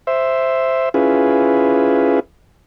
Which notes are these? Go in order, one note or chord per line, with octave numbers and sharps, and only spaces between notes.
C5 E5
C#4 E4 F4 G#4 B4